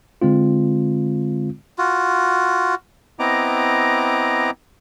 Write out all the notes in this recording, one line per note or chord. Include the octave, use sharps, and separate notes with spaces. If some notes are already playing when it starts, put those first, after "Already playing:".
D3 G#3 C4 F4
F4 F#4
B3 C4 E4 D#5 A#5 D6